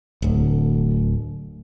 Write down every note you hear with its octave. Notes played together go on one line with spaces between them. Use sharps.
D1 D2